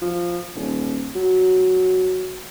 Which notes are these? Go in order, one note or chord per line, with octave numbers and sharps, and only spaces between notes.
F3
D#1
F#3